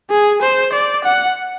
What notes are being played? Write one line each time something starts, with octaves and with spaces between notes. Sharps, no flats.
G#4
C5
D5
F#5